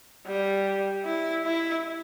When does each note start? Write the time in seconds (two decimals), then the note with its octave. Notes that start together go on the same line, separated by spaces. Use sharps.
0.27 G3
1.05 E4
1.45 E4